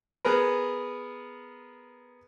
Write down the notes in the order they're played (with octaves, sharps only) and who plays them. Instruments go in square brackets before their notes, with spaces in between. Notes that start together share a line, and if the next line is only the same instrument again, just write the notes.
[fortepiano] B3 G#4 A#4 B4